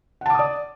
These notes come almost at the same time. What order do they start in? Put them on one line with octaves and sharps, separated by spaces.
F#5 A5 D6 D#6 D5